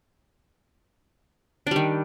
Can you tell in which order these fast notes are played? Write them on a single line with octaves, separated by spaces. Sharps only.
D4 G3 D#3